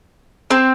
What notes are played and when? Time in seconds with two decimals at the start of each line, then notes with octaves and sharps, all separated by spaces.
0.51 C4